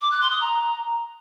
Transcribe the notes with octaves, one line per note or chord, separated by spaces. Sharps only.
D6
F#6
C6
D#6
A#5